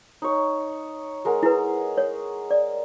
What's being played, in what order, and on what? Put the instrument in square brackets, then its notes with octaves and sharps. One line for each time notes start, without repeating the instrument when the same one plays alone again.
[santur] D#4 C#5
G#3 A#4 F#5
[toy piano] E4 B4 [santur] G#4
[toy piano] C#5
D5